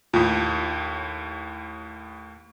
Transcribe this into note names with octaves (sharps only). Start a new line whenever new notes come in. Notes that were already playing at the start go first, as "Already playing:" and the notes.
D#2 A2 F4